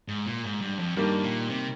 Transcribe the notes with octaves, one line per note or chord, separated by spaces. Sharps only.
G#2
A#2
G#2
G2
F2
G2 D#3 G3 A#3
A#2
C3